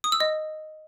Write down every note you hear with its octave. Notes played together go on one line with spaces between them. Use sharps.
D#6
E6
D#5